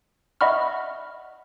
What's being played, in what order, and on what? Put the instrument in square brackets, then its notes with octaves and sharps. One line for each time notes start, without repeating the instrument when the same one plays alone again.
[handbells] D#5 E5 F#5 B5 C#6 F6